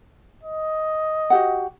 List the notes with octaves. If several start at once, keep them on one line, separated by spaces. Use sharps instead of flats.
D#5
F#4 G4 F#5